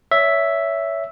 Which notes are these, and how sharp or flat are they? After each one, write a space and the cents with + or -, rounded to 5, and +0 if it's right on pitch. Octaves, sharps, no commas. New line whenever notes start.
C#5 +20 E5 +0